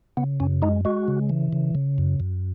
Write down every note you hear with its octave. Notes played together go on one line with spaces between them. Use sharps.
C#3 B3
F#2 C#4
G#3 D#4
G#3 F#4
C#3
E3
C#3
C#3
F#2
F#2